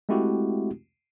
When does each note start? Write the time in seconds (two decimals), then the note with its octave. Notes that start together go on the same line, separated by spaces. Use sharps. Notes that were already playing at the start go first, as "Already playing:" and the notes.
0.09 G#3 A3 C4 E4 F#4 G4